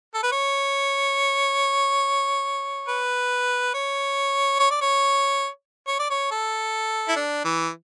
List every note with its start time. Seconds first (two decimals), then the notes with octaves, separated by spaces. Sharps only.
0.14 A4
0.23 B4
0.32 C#5
2.88 B4
3.74 C#5
4.60 C#5
4.71 D5
4.81 C#5
5.87 C#5
5.99 D5
6.11 C#5
6.31 A4
7.09 E4
7.16 D4
7.44 E3